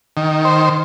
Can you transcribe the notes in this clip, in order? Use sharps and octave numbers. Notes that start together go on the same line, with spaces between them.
D#3
C5